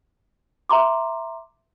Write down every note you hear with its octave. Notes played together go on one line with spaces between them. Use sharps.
E5 A#5 C6 D6